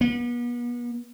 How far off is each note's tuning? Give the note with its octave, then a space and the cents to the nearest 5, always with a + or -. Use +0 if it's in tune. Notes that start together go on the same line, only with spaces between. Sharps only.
B3 -40